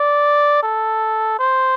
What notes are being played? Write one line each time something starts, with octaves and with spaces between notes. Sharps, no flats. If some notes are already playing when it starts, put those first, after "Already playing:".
Already playing: D5
A4
C5